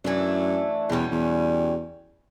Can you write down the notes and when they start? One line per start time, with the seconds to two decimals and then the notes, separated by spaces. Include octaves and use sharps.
0.04 F#2 E3 A3 D4
0.90 E2 B2 G3 C#4
1.11 E2